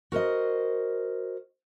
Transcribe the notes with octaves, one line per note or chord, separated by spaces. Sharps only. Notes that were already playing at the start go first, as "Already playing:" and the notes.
F#4 A#4 C5 D#5